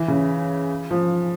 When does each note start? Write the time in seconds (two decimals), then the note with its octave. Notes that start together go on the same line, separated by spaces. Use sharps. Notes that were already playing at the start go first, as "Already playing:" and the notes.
Already playing: E3
0.08 C#3
0.91 F3